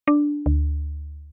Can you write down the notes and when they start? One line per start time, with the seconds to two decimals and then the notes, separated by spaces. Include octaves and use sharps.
0.08 D4
0.46 D2